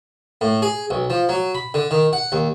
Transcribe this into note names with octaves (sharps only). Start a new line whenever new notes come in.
A2
G#4
B1
F3
F#3
B5
D3
D#3
F#5
D#2